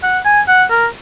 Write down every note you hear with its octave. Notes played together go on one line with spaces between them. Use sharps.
F#5
G#5
F#5
A#4